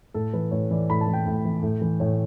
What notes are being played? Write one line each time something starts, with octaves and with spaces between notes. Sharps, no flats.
A2 A4
E3 B4
A2 C#5
E3 D5
A2 B5
A5
E3
G5
A2
E3
A2
E3
A2 C#5